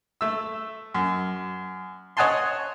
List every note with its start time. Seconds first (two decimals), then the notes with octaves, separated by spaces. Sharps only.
0.21 A3 E6
0.94 F#2
2.17 C#5 D#5 F#5 G#5 A5 C6